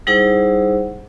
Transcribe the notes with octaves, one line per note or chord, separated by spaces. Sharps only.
G3 D#4 E4 G#4 C5 F#5